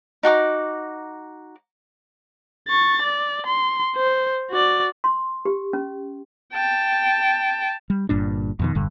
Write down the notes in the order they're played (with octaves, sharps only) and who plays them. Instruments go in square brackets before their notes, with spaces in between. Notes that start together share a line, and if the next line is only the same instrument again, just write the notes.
[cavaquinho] D#4 F#4 A#5 D6
[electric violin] C#6 A6
D5
C6
C5
F#4 D5
[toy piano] C6
G4
C#4
[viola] G5 A5
[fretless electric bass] G3
G1 G2 A#2 D4
F2 B2 D#3
E1 G2 D3